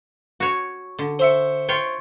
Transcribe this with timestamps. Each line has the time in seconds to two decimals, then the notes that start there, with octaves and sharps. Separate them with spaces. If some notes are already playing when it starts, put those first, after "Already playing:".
0.40 F#4 C#5
0.99 D3
1.19 C5 E5 C#6
1.69 F4 C#5 G5